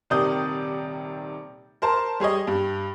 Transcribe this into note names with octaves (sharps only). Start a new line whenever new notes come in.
D#1 C3 D#3 D5 D#6 G6
A#4 C5 A5
G3 G#4 C#5 D#5
G2